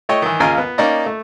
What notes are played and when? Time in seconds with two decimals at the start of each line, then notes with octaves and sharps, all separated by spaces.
0.09 A3 C#5 D#5 G5
0.22 D#3 E3
0.40 D#2 C#3 A#3 F4 A#4 G#5
0.58 B3
0.78 A#3 C#4 D#4 D5 D#5
1.06 A3